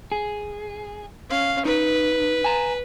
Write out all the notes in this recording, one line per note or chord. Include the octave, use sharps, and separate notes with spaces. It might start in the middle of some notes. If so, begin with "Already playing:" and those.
G#4
C#4 F5
D#4 B4
G#5 A#5